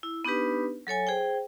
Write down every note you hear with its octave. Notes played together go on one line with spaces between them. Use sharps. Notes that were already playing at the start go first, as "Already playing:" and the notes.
E4
B3 D4 D#4 G4 B4
F#3 A4 C#5 G#5
G#4 C5 G5